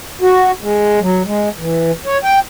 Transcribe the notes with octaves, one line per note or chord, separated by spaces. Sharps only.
F#4
G#3
F#3
G#3
E3
C#5
G5